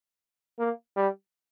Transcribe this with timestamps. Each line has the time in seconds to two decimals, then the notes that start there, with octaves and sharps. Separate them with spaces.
0.59 A#3
0.96 G3